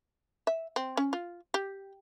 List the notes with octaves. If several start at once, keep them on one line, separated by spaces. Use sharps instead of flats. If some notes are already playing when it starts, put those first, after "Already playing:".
E5
C4
C#4
F4
G4